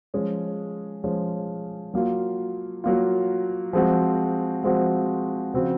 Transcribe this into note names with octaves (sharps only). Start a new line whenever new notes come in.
F3 G#3 C#4
F3 G#3 C#4
F#3 A#3 F4
F#3 A#3 F4
F3 G#3 C4 F#4
F3 G#3 C4 F#4
C#3 F3 C4 F#4